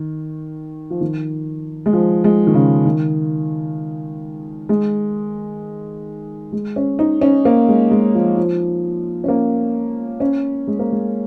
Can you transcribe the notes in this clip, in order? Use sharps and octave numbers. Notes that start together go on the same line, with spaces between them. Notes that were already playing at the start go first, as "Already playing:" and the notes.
Already playing: D#3
F3
D#3
G#3
F3
G#3
D#3
C#3
D#3
G#3
G#3
C#4
D#4
C#4
A#3
G#3
G#3
F3
F3
C#4
A#3
C#4
G#3
A#3
G#3